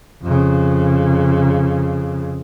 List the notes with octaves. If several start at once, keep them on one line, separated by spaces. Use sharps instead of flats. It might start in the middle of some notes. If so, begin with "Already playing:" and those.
F2 C#3